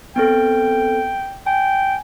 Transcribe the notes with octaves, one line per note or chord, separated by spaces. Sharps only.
B3 C4 A4 G5
G5 G#5